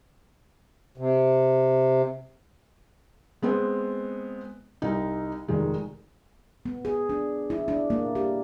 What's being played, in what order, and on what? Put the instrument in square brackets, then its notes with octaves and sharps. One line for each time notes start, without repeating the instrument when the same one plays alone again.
[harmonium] C3
[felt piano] G#3 B3 C4
C2 D#4
F1 D#3 G#3
[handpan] B3
G#4
D4
E4
D4
A#3
G4